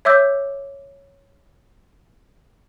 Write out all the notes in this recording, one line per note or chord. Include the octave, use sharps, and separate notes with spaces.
C#5 E5 D6 E6 G6